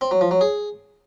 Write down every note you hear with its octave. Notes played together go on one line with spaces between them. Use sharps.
C4
F#3
F3
F#3
G#4